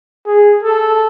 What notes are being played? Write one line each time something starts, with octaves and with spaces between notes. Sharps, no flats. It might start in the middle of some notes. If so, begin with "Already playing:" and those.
G#4
A4